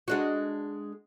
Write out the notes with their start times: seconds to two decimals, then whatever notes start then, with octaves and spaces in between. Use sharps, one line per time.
0.08 G#3 D4 F#4